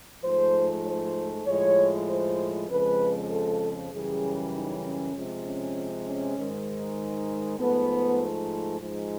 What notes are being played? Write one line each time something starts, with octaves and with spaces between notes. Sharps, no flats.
G#2 F3 A3 C5
C5
A2 F3 G#3 C#5
C5
F2 C#3 F3 G#3 B4
A4
F#2 C#3 E3 G3 G#4
D#4
C#4
C3 F3 G#3
C#4
C#4
G#2 D#3 G#3
G#2 F3 A3 B3
G#2 F3 G#3